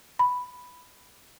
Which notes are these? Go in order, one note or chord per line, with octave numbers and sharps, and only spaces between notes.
B5